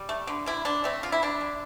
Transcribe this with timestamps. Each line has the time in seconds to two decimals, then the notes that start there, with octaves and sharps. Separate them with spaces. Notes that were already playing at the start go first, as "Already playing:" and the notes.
Already playing: G3
0.09 A3
0.27 D3
0.46 D3 E4
0.65 D3 D4
0.84 A3 C4
1.03 D3 F4
1.12 E4
1.22 D3 D4
1.41 D3